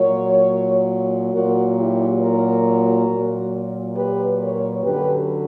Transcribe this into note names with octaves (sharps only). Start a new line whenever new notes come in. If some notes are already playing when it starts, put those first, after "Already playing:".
Already playing: A#2 F#3 A#4 C#5
A#2 F#3 F#4 A#4
E4 G4
F#4 A#4
A#2 F#3
G4 B4
A#4 C#5
F#2 D3 F#3 G4 B4